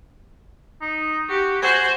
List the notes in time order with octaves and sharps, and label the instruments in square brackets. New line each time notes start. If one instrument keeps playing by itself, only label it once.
[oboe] D#4
[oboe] F#4 [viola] G4
[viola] F#4 C5 [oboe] G#5